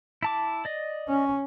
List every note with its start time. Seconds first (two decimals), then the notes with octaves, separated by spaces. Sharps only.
0.23 E4 A5 D6
0.65 D5 D#5
1.08 C#4